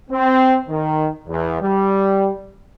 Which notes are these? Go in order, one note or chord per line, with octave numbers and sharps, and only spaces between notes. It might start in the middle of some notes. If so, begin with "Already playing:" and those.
C4
D#3
E2
G3